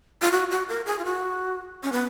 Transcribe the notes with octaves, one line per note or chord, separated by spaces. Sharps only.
F4
F#4
F#4
A#4
G#4
F4
F#4
C#4
B3